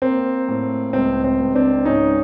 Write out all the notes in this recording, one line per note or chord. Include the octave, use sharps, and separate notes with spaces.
A#3 C4
A2
C#2 C4
C4
C#2
C4 D4
G#2 C#4 D#4